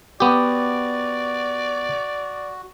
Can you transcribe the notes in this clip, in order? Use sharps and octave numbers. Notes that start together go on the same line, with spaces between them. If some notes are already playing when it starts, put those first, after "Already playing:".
B3 F#4 G4 D5